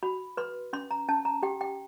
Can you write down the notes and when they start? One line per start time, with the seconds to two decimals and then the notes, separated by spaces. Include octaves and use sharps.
0.03 F#4 B5
0.37 B4 C6
0.73 C#4 C6
0.91 A#5
1.09 C#4 A5
1.25 A#5
1.43 G4 G5
1.61 G5